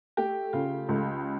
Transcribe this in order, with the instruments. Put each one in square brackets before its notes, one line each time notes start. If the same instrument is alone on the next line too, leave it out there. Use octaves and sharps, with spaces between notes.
[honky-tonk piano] A3 [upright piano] G4
[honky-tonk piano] C#3 [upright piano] F4
[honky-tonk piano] C#2